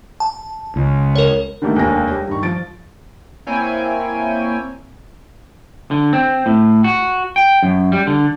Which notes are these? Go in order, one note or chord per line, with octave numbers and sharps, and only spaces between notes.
A5
C#2
A#4 C#5
D3 D#3 G3 A3 A#3
F1 D#2 G#3 A#3 D4 A#6
G3
G2 D#3 C#6
F3 A6 D7
A#3 C4 E4 C#5 G5 G#5
D3
C4
A2
F#4
G5
F#2
G3
D3